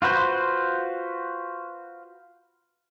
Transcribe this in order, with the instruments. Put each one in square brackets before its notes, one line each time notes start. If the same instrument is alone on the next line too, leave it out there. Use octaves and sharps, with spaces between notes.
[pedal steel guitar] F4 F#4 B4 C5